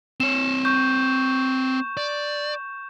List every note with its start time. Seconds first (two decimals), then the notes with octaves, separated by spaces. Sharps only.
0.20 C4 C#5 E7
0.65 C#6 G6
1.97 D5